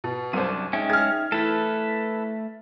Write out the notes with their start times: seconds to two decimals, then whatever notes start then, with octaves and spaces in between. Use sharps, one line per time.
0.04 B2
0.33 C2 F#2 D4 C5 D#7
0.73 G#3 C#4 D#4 E5 G5
0.90 G#4 F6 G#6
1.32 E3 A3 A4 B4